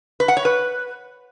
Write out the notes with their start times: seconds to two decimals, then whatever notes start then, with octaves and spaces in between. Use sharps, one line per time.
0.20 B4
0.28 F#5
0.37 C#5
0.45 B4